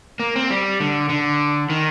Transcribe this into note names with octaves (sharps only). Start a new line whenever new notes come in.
A#3
C4
G3
D3
D3
D#3